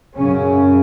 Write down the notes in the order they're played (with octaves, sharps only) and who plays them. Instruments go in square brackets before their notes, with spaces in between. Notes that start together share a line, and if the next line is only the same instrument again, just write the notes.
[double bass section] F#2 C#3 C#4